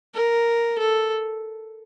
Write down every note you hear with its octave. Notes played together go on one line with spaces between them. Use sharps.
A#4
A4